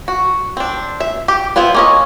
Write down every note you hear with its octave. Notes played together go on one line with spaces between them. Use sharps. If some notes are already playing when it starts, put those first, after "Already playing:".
F#4
C4 D4
E5
G4
B3 C4 E4 F4 B4
A#3 C#4 D#5